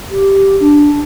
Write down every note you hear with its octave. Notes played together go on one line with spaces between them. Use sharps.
G4
D4